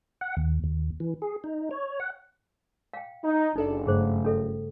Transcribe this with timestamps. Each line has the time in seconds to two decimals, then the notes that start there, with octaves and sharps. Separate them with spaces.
0.21 F#5
0.37 D#2
0.64 D#2
1.00 E3
1.22 G#4
1.44 D#4
1.71 C#5
2.00 F#5
2.93 F5 G5
3.24 D#4
3.56 F#1 D4 D#4 A4 D5
3.87 G2 C#3 A3 G#4 C5
4.25 C#4 A4 E5